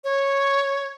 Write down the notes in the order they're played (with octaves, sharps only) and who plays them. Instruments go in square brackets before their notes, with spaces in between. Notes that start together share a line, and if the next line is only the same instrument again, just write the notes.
[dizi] C#5